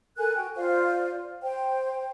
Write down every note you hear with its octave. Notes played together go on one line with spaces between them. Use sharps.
A4 A#4 G#5 F#6
F#4 G5
F4 C5 D5 F5
C5 G5